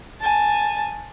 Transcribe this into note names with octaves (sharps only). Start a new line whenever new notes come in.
G#5 A5